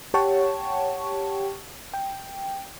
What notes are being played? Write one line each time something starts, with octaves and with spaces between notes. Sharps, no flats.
G4 C#5 F#5 G5 A5 C#6
G5